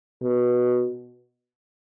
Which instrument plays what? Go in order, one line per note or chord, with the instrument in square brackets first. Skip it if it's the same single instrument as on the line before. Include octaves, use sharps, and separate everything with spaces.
[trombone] B2